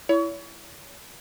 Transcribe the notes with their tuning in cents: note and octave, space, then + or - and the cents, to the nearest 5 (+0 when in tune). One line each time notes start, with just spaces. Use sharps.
E4 +10 C#5 +35